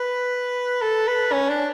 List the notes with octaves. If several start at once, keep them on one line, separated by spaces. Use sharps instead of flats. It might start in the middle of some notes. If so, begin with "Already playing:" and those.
Already playing: B4
A4
B4
C#4
D4